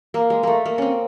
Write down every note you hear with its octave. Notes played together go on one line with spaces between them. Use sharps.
A#3
G#3
A3 A#3
A#3
C4 C#4